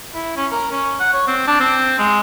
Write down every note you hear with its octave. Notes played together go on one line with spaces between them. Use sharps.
E4
C#4
A#4
C#4
F#5
C#5
C4
D4
C4
G#3